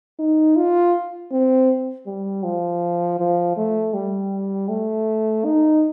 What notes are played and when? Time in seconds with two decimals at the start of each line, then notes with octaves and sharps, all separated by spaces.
0.19 D#4
0.56 F4
1.32 C4
2.06 G3
2.44 F3
3.19 F3
3.57 A3
3.94 G3
4.69 A3
5.45 D#4